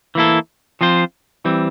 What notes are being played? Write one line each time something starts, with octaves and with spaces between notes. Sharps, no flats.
E3 A#3 E4 A4
F3 C4 F4 C5
E3 G3 C4